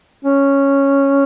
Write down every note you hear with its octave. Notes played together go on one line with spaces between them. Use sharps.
C#4